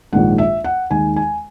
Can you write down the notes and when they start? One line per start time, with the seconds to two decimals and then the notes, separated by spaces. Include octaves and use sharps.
0.13 A#1 G#2 D#3 G#3 F#5
0.38 E5
0.64 F#5
0.90 D#2 D#3 G#3 G#5
1.16 G#5